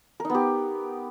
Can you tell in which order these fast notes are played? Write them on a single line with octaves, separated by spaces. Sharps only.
A#4 D#4 B3 G4